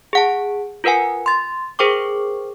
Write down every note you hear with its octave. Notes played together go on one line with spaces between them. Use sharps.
G#4 F#5 A5
F4 A#4 B4 F#5 G#5
C6 A6
G#4 A#4 C5 G5 C#6 D6